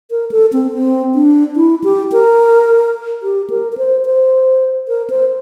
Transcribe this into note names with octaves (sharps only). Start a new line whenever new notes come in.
A#4
A4
C4
C4
D4
E4
G4
A#4
G4
A#4
A#4
C5
C5
A#4
C5